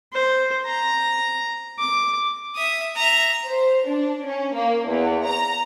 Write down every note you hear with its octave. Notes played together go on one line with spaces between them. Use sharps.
C5
A#5
D6
E5 D#6
E5 A#5
C5
D4
C#4
A#3
E2
A#5